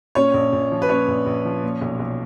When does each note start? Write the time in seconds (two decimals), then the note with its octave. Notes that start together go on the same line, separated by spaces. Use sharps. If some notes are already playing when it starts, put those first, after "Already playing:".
0.15 A#2 C#4 C#5
0.34 A#1
0.53 A#1
0.72 F3
0.82 B4
0.89 A#2 C#4 C#5
1.08 A#1
1.26 A#1
1.45 F3
1.63 A#2
1.81 B1
1.99 B1